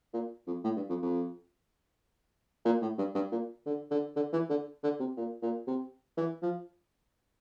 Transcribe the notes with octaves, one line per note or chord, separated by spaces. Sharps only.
A#2
F2
A2
G2
F2
F2
A#2
A2
G2
G2
A#2
D3
D3
D3
E3
D3
D3
C3
A#2
A#2
C3
E3
F3